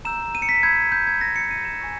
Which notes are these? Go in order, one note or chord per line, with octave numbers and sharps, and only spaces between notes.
A#5 E6 G6 E7
D#7
C#7
B6
B5 E6 G6 G#6
G6
G#6
B5 E6 G6 A#6
C#7
D#7
E7
G#5 C#6 E6